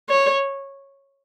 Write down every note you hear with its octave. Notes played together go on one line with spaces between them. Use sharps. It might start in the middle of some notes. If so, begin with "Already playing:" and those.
C#5